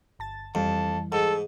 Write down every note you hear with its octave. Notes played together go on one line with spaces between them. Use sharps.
G1 A5 A6
F2 E3 G3 A5
G#2 A4